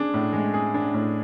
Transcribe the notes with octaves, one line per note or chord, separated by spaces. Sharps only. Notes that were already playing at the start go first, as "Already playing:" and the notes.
Already playing: D4 G#4
A2
G#3
G#4
D4
A2